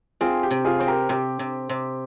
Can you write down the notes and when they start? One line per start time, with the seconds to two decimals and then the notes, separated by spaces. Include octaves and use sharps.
0.21 C4 F4 G#4
0.43 G4
0.51 C3
0.65 F4 G#4
0.80 C4 C5
0.87 G4 A#4
1.09 C3 G4
1.39 C3
1.69 C3